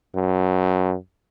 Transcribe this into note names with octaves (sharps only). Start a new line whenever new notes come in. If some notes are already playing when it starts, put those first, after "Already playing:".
F#2